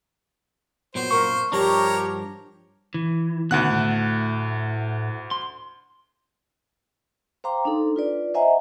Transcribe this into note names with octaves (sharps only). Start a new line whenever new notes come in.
A#2 F#3 B3 C5
F#2 A#2 A#3 A#4 C#6
G2 F3 D4 G4 A#4 C#5 A#5
E3
D2 B2 D#3 F#5 F#6
A2 A3
C6
C5 F5 G5 A#5 C6 D6
D4 D#4 A4
F4 B4 D5
C5 D#5 E5 F#5 G#5 A#5